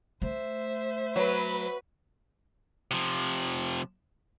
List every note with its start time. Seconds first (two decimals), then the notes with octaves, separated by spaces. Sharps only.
0.22 A3 C5 E5
1.16 F#3 B4
2.91 C3 F3